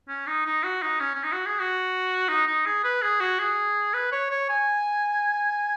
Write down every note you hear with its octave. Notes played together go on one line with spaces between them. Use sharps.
C#4
D#4
D#4
F#4
D#4
C#4
C#4
D#4
F#4
G#4
F#4
D#4
D#4
G#4
B4
G#4
F#4
G#4
B4
C#5
C#5
G#5